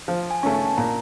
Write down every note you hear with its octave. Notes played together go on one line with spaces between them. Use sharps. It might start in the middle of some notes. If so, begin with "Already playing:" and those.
F3
G#5
A3 C#4 G#5
A5
A#2 A#5